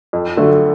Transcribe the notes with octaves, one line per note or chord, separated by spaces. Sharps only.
F2
D3 F#3 A3